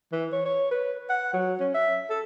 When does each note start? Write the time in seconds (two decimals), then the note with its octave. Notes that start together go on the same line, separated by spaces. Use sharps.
0.12 E3
0.32 C#5
0.46 C#5
0.71 B4
1.10 F#5
1.34 F#3
1.60 C#4
1.74 E5
2.10 A4